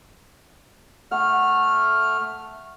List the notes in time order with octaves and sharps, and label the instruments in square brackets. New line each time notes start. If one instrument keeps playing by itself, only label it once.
[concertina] A3 F6 [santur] F#5